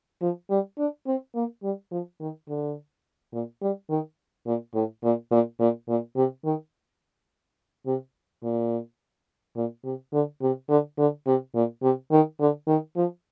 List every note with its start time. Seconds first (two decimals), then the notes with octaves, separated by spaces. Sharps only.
0.21 F3
0.50 G3
0.78 D4
1.07 C4
1.35 A#3
1.63 G3
1.91 F3
2.20 D#3
2.48 D3
3.33 A#2
3.62 G3
3.90 D#3
4.46 A#2
4.74 A2
5.03 A#2
5.31 A#2
5.60 A#2
5.88 A#2
6.16 C3
6.45 D#3
7.86 C3
8.43 A#2
9.56 A#2
9.84 C3
10.13 D3
10.42 C3
10.69 D3
10.98 D3
11.26 C3
11.55 A#2
11.82 C3
12.12 D#3
12.40 D3
12.67 D#3
12.96 F3